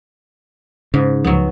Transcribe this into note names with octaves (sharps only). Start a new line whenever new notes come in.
G#2 C#3
C#2 F3 F#3 B3